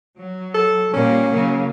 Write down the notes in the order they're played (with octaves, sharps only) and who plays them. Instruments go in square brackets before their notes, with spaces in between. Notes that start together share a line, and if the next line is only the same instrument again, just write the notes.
[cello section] F#3
[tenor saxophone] A4
[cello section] A#2 G3 A#3 [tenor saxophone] C#4
[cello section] C#3 F#3 A#3